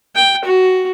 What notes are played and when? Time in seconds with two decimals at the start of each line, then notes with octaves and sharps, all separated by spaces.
0.15 G5
0.45 F#4